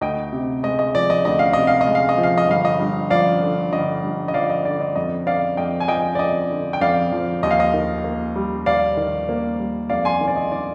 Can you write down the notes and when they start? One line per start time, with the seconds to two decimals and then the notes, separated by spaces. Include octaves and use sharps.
0.01 D2 D#5 G5
0.33 C3
0.63 G#3 D#5
0.79 D#5
0.95 F3 D5
1.10 D#5
1.25 D2 D#5
1.39 F5
1.53 C3 D#5
1.67 F5
1.81 D#5
1.87 G#3
1.95 F5
2.09 D#5
2.18 F3
2.23 F5
2.38 D#5
2.48 G1 F5
2.65 D#5
2.80 G2
3.10 F3 D5 F5
3.42 D3
3.72 G1 D#5
4.04 G2
4.28 D#5
4.34 F3 D5 F5
4.50 D#5
4.65 D3 D5
4.81 D#5
4.96 F2 D#5
5.26 D3 D5 F5
5.57 F2 D#5 G5
5.80 G#5
5.88 F3 D#5 G5
6.15 D5
6.19 F2 D#5
6.50 D3
6.73 G5
6.81 F2 D5 F5
7.12 F3
7.43 D#2 D#5
7.51 F5
7.60 D#5
7.74 D#3
8.04 A#3
8.36 G3
8.66 D#2 D5 F5
8.97 D#3
9.29 A#3
9.59 G3
9.89 F2 D5 F5
10.05 G#5 C6
10.21 D#3
10.28 D5
10.36 D#5
10.52 D#4 D5